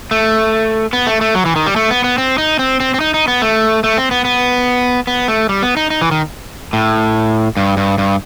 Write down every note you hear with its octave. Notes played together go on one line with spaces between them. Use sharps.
A3
B3
A3
A3
F#3
E3
D#3
G3
A3
B3
B3
C4
D#4
C4
C4
C4
D#4
D#4
B3
A3
A3
C4
B3
B3
B3
A3
G3
B3
D#4
D#4
E3
D#3
A2
G2
G2
G2